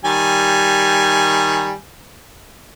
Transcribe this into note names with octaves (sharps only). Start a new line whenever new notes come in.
D#3 G3 G#5